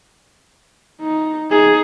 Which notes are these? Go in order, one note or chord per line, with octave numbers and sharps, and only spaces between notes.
D#4
D#4 G#4